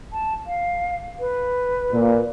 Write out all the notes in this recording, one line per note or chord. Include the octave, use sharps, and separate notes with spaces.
A5
F5
B4
A#2